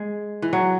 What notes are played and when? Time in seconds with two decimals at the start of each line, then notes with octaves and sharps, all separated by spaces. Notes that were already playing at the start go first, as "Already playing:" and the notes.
Already playing: G#3
0.42 E3
0.53 F#3